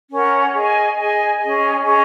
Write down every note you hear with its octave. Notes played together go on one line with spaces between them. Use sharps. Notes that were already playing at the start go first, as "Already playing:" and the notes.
C#4 A#4 F#5
G#4 D#5 G#5
G#4 D#5 G#5
C#4 G#4 D#5
C#4 G#4 D#5